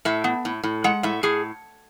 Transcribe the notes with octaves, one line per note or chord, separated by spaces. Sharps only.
A2 E5
B3
A2
A2
G#3 F#5
A2 E5
A2 G#4